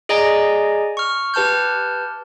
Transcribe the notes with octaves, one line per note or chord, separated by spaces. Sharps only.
G#4 D5 D#5 G#5 A#5
C#6 F6
G4 B4 A5 F6 G6